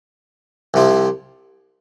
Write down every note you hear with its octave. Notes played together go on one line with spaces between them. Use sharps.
C2 C3 F3